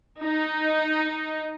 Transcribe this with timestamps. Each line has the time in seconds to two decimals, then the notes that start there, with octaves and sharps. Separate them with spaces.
0.23 D#4